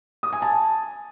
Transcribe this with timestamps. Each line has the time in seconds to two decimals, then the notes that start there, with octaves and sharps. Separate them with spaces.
0.23 D#6
0.33 G#5
0.42 A5